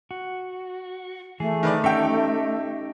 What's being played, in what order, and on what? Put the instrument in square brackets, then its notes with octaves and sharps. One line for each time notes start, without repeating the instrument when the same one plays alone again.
[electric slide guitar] F#4
[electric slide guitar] E3 G#4 [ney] A3
[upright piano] D#3 B4 D5
[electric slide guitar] C#4 D#4 G4 [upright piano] E5 G5